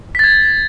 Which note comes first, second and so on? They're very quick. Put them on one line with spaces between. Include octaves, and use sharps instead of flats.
B6 A6 G#6